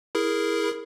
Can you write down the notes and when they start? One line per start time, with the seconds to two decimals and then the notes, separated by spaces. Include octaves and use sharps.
0.15 E4 G#4 A#4